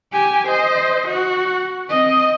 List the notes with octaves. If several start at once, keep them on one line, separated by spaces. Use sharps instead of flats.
G4 G#5
C5 D#5
F#4
C4 D#5